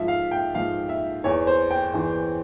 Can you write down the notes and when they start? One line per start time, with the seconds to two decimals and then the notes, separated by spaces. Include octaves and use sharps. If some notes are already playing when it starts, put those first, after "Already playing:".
Already playing: G#2 F3 E5
0.08 F5
0.31 G5
0.55 G#2 F3 F5
0.89 E5
1.24 E2 E3 C#5
1.47 C5
1.71 G5
1.94 E2 E3